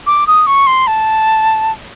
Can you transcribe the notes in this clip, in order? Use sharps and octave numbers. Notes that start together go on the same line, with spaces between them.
D6
D#6
C#6
C6
A5